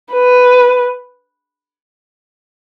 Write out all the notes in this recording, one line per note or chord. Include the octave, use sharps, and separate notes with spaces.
B4